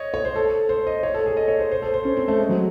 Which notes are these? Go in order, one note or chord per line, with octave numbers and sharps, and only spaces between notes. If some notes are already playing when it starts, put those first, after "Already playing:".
Already playing: C#5 D#5
C#5
C5
A4
C5
D#5
C#5
A4
G#4
D#5
C#5
C5
C5
A4
C5
C#4
C4
A3
G#3
F#3